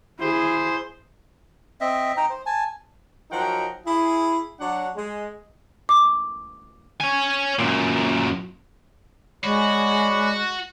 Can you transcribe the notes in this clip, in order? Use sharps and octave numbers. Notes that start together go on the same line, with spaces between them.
E4 G#4 C5
C4 D#5 E5
D#4 G5 A#5
C5
G#5 A5
F3 F#3 D#4 F#4 A#4 G5
E4 G#4
F#3 D4 F#5
G#3
D6
C#5 G#5
F#2 A#2
G#3 F#4 C#5 D5 B5